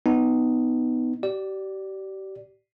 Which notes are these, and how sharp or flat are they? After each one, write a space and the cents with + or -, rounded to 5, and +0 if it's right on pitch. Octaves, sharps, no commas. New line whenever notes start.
B3 +15 D#4 +0
G4 -35 D5 +0